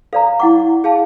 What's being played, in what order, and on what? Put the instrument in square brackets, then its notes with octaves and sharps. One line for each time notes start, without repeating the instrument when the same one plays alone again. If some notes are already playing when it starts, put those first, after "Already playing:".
[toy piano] A4 D5 A#5 [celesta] F5
[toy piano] E4 F#5 D6
[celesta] G#4 F5 A5